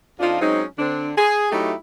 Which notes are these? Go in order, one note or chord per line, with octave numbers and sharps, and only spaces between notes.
F2 F3 D4 D#4 F4
F#3 G#3 C4 C#4 D#4
D3 C4 D4
G#4
F#3 A3 D#4 E4 F#4 G4